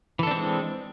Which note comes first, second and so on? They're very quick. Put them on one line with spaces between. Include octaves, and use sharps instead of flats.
E3 A4 D4 C4 G#3